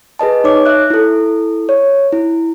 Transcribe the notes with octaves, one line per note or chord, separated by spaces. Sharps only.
G#4 B4 D#5 A5
D#4 C#5 D6
E5 F#6
E4 A4
C#5
E4